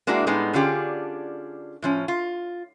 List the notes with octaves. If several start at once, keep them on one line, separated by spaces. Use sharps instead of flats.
G#3 A#3 D4 E4 F#4
A2 G3 G#3 B3 D#4
D3 C#4 D4 F4 G4 G#4
A2 F3 C#4
F4